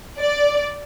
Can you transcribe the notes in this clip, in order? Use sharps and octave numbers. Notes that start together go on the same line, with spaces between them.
D5